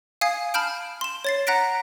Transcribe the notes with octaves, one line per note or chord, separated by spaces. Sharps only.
F5 G#5 D#6 G#6 C7
A5 B5 F6 G6 D7
C6 E7
C#5 A6 C7
F#5 A#5 F#6 A#6 B6 D7